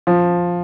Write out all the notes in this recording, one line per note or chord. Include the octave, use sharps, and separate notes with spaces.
F3